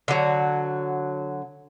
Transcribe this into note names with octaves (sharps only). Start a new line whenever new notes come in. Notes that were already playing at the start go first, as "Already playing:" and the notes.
D3 F#3